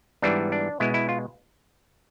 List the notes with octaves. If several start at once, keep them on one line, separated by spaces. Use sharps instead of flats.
G#2 E3 G3 B3 D4
D4
B2 G#3 B3 E4
E4
F4